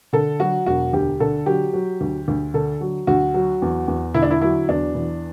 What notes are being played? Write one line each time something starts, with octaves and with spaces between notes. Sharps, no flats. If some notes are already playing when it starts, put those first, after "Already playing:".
D3 A4
F#3 F#4
E1 F#4
D2 G4
D3 A4
F#3 G4
F#3
D2
D2
D3 A4
F#3
D2 F#4
F#3
E2
E2
D3 E4
D4
E4
F#3 E4
E2 D4
E3